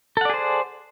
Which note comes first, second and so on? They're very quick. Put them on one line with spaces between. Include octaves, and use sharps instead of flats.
A4 F#5 D5 G#4 C5